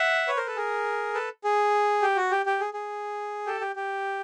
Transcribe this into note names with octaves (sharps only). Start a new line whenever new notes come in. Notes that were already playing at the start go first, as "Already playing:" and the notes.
Already playing: E5 F#5
B4 C#5
A#4 C5
A4 B4
G#4 A#4
A4 B4
G#4
G4
F#4
G4
G4
G#4
G#4
G4 A4
G4
G4